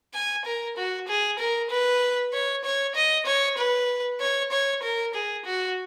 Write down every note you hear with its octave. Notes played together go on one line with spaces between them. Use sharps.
G#5
A#4
F#4
G#4
A#4
B4
C#5
C#5
D#5
C#5
B4
C#5
C#5
A#4
G#4
F#4